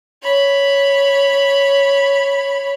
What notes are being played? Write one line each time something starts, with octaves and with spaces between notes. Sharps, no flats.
C#5 B5